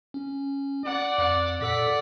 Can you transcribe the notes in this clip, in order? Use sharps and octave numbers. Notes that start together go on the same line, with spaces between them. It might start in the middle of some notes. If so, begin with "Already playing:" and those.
C#4
D5 F#5
F2 F#5 D6
A#2 A4 D5 F#5 E6 B6